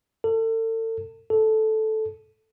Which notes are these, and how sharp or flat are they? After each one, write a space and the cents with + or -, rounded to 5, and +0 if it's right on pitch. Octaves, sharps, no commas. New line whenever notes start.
A4 +35
A4 -10